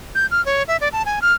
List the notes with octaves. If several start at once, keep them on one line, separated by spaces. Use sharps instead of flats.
G6
F6
C#5
E5
D5
A5
G#5
F6